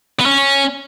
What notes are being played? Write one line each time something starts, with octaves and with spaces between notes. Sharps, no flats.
B3
C#4